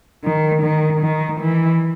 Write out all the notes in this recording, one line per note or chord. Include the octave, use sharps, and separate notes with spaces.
D#3
D#3
D#3
E3